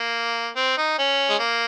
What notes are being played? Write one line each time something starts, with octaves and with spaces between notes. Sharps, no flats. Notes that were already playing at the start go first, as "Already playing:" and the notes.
Already playing: A#3
C4
D#4
C#4
G#3
A#3